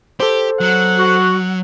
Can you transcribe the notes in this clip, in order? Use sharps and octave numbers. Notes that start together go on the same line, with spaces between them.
G4 A4 C5
F#3 F#5
F#4